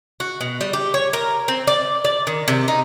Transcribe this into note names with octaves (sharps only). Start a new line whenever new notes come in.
F#4
B2
G3
G4
C#5
A#4
C4
D5
D5
D#3
C3
D#4